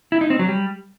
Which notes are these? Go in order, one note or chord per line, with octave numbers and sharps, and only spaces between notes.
E4
D#4
C4
F#3
G3